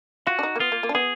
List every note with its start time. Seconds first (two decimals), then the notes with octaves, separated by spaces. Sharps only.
0.27 F4 F#4
0.39 D4
0.43 D#4
0.56 A#3
0.60 B3 F4
0.72 A#3
0.83 A#3
0.89 D4
0.95 B3 G#4